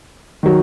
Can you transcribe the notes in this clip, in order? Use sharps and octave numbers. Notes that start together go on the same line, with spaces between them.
D#3 F#3